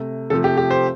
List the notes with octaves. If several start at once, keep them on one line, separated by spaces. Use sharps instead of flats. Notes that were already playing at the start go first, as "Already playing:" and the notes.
Already playing: C3 A3
C3 F3 A3 A4
G4
G4
C5